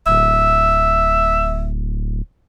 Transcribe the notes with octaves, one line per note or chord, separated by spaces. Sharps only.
D1 E5